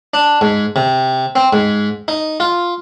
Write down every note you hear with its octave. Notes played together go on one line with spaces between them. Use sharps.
D4
G#2
C3
C4
G#2
D#4
F4